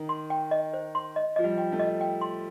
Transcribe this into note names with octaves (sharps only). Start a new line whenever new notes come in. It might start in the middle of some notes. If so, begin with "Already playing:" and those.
Already playing: D#3
C6
G5
D#5
C5
C6
D#5
F3 D#5
G3
G5
A3
D#5
G5
C6